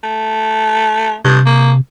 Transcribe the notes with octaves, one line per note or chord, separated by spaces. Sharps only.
A3
G2 C3
A#3